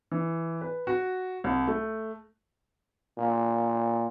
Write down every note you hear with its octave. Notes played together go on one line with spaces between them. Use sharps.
E3
B4
F#4
C2
A3
A#2